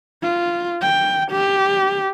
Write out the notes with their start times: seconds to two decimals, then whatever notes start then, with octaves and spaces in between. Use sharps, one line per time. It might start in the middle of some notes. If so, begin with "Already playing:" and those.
0.23 F4
0.82 G5
1.32 G4